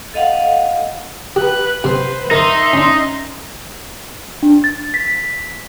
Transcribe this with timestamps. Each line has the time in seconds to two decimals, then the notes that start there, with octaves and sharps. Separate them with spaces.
0.14 A4 D#5 F5 F#5
1.36 G4 B4 F#6
1.84 C3 B4 C5 C6
2.31 D#4 A#4 E5 A#5 C6 C#6
2.73 C#4 D4
4.43 D4
4.64 A6
4.94 B6